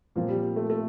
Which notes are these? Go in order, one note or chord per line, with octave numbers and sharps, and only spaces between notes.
A#2 F3 A#3 C4 F4 C5
G3
G3
A3
A3